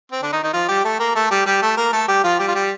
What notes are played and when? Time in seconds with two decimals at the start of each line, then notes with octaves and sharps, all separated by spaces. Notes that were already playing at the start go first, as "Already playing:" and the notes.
0.12 C4
0.22 D3 D4
0.33 D#3 D#4
0.43 D#3 D#4
0.53 F3 F4
0.68 G3 G4
0.84 A3 A4
0.99 A#3 A#4
1.15 A3 A4
1.31 G3 G4
1.46 G3 G4
1.62 A3 A4
1.77 A#3 A#4
1.93 A3 A4
2.08 G3 G4
2.24 F3 F4
2.39 G3 G4
2.48 F4
2.54 G3 G4